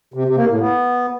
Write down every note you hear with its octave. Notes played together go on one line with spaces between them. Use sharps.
C3
C3
A#3
A2
B3